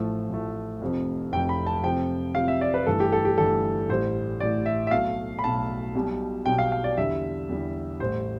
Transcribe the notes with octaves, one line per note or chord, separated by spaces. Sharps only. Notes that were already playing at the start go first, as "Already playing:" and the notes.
Already playing: A1 A2 F3 A3
A1 A2 F3 A3
F1 F2 C3 F3
F1 F2 C3 F3 G5
B5
A5
F2 C3 F3 G5
F2 C3 F3 F5
E5
D5
B4
G1 G2 E3 A3 A4
G4
A4
G4
G1 G2 E3 A3 A4
A1 A2 G3 C5
A1 A2 G3 D5
E5
E5
B1 B2 A3 F5
B5
B1 B2 A3 A5
B1 B2 G3
B1 B2 G3 G5
F5
F5
D5
E2 D3 G3 E5
E2 D3 G3
A1 A2 G3 C5